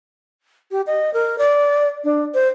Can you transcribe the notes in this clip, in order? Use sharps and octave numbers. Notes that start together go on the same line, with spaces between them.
G4
D#5
A#4
D5
D4
C5